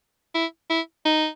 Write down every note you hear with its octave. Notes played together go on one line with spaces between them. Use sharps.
E4
E4
D#4